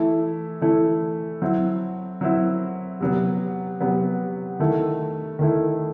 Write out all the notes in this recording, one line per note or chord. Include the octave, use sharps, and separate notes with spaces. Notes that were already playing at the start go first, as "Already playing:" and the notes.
Already playing: E3 A3 E4
E3 A3 E4
F#3 C4 E4
F#3 C4 E4
C3 F#3 B3
C3 F#3 B3
D#3 A3 E4
D#3 A3 E4